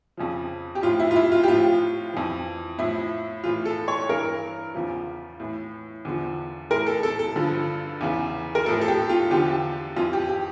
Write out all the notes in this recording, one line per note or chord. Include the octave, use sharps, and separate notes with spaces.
F2 C#3 F3
G4
A2 F3 F4
E4
F4
E4
F4
G4
A2 F3 F4
F2 E3
A2 F3 E4
A2 E3 F4
A4
C#5
G2 E3 A#4
E2 C#3 F3
A2 E3
E2 D3 F3
A2 E3 A#4
A4
A4
A4
G2 D3 F3
E2 C#3 E3
A#4
A2 F3 A4
A4
G4
F4
E2 D3 F3 G4
F2 E3 F4
G4
G4